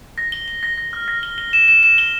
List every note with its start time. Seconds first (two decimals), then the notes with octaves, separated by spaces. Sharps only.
0.18 A#6
0.32 G7
0.48 G7
0.63 A#6
0.78 A#6
0.93 F6
1.08 A#6
1.23 G7
1.38 G7
1.53 E7
1.68 E7
1.83 E7
1.98 G7